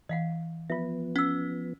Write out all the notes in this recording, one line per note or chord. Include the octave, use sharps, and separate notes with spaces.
E3 D#5 F5 F#5
F3 B3 F4 E5
C#4 F#5 E6